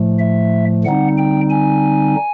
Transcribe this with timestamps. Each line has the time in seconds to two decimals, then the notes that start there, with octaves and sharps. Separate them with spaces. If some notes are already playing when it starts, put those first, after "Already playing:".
Already playing: A2 F3 A3
0.19 E5
0.84 D3 G3 C4 D#4 F#5
1.18 G5
1.50 G#5